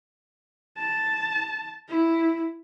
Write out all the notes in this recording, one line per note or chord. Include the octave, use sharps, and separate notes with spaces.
A5
E4